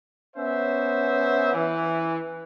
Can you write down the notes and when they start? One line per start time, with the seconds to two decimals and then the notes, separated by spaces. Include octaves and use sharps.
0.36 B3 C#4 C5 E5
1.53 E3